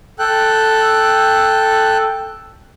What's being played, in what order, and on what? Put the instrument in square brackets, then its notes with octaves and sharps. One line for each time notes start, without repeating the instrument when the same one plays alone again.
[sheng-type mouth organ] A4 G5 F#6